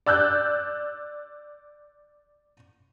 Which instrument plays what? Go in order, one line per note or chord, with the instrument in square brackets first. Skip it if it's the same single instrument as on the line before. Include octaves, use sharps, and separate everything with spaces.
[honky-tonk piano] D5 E6 F#6 G6